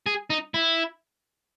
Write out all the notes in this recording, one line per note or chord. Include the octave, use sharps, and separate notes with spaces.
G#4
D#4
E4